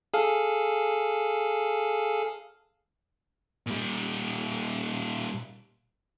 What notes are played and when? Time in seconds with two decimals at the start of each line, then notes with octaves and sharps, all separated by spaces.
0.14 G#4 A4 F5
3.67 A#2 G3